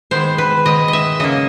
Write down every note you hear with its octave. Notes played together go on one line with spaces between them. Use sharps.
D#3 G#3 B3 C5
B4
D#3 G#3 B3 D#5
D#5 E5
C#3 F#3 A#3 D#5